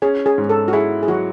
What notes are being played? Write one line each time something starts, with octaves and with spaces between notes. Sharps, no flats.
C#4 G#4
G#4
G#2
A4
F#4
E4 G#4
G#4
F#3 F#4